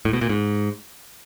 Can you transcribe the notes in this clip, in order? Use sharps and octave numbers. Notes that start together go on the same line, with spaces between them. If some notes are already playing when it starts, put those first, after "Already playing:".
A2
B2
A#2
G#2